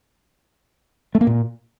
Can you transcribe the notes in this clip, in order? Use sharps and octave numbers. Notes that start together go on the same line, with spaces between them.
A3
A#3
A#2